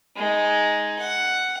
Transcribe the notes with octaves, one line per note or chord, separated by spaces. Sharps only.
G#3 D#4
F#5